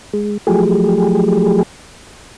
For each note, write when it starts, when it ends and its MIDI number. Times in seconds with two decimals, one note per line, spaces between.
0.13 0.38 56
0.47 1.63 53
0.47 1.63 54
0.47 1.63 57
0.47 1.63 67
0.47 1.63 68